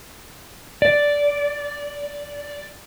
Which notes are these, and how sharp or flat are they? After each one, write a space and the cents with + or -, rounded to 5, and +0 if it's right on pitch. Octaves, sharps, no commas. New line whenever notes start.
D5 -10